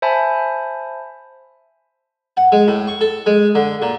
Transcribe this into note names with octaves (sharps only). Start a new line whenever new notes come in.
C5 E5 G#5 A5 B5
F#5
G#3
A2
C#6
A4
G#3
D3
A#2